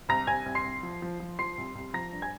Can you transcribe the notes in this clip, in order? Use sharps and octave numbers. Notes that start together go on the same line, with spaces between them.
C2 A#5 A#6
C2 G#5 G#6
C2
C6 C7
C2
F3
F3
F3
F3 C6 C7
C2
C2
F3 A#5 A#6
G2
G#5 G#6